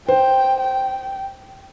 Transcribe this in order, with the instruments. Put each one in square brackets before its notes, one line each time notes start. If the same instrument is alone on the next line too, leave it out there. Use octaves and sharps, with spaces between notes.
[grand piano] C5 [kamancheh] G5
[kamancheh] G5